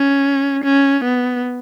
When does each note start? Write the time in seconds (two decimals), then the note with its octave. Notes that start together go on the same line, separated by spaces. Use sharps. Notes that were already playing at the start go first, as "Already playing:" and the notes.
Already playing: C#4
0.64 C#4
1.04 B3